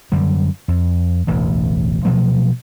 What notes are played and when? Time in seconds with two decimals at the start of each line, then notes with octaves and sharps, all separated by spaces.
0.12 F#2 D3 G3
0.68 F2
1.27 E1 A1 D2
2.05 B2 F3 F#3 A3